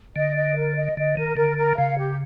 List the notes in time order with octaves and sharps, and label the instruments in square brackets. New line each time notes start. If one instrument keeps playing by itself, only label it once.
[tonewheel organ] D3 [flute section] D#5
[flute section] D#5
A#4
D#5
[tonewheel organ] D3 [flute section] D#5
[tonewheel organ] D#3 [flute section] A#4
[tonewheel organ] D3 [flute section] A#4
[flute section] A#4
[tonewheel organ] C#3 [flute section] F5
[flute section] G4